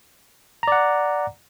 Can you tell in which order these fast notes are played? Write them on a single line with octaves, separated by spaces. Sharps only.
A#5 D5 F#5